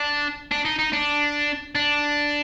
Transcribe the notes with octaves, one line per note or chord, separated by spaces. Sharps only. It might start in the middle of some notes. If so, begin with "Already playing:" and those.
Already playing: D4
D4
D#4
D#4
D4
D4